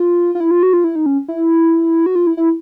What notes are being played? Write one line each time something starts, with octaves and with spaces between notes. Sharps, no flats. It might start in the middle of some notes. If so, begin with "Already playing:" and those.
Already playing: F4
F4
E4
F4
F#4
F4
E4
D#4
C#4
E4
F#4
F4
E4
E4